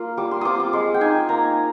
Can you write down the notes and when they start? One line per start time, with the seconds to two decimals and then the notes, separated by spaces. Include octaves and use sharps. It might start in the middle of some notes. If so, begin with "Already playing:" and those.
Already playing: A#3 F4
0.17 G3 D6
0.31 C6
0.41 C4 F4 D6 D#6
0.60 D6
0.73 G#3 C6
0.94 G5
1.01 D#4 G#5
1.29 A#3 A#5